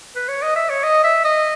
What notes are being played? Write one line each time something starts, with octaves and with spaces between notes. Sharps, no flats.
B4
C#5
D#5
E5
C#5
D#5
E5
D#5